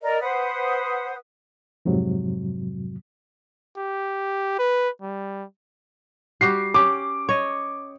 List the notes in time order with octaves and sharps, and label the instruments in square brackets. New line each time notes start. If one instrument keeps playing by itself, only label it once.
[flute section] A#4 D5 D#5
B4 C5 F#5 D#6
[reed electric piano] F2 G#2 C3 F#3
[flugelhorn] G4
B4
G3
[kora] G3 F#4 G4 [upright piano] C7
[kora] C#4 G4 [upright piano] D6
[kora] C#5 D#5